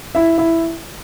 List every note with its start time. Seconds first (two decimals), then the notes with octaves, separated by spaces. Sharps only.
0.15 E4 E5
0.38 E4 E5